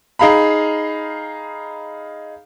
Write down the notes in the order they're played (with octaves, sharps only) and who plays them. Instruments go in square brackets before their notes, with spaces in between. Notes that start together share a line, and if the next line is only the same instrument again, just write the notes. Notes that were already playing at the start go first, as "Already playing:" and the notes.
[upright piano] D#4 G#4 F5 A#5 B5